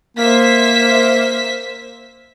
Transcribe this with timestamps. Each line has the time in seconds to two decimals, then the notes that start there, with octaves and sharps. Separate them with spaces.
0.17 A#3 C5 E5 B6